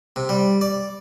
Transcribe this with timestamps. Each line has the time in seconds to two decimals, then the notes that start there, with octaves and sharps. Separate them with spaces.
0.16 C3
0.29 G3
0.61 D5